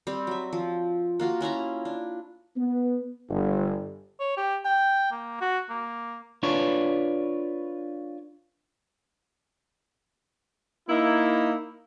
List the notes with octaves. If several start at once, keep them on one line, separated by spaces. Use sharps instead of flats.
G3 C4
F#3 E5
F3
A#3 F4 F#4
C#4 E4 F4 A#5
D4
B3
G1
C#5
G4
G5
A#3
F#4
A#3
D4 F4 B4 C#5
A#3 D#4 E4